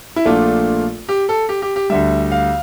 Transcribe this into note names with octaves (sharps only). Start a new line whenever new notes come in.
E4
A#1 A#2 A3 D4 F4
G4
A4
G4
G4
G4
D2 D3 G3 E5
F5